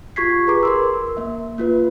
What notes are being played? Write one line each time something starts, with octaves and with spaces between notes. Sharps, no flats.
F4 G4 C#6 G#6 B6 C7
G#4 B4 A#5 D6
A#4 C6 E6
A#3 E5
A#3 F4 B4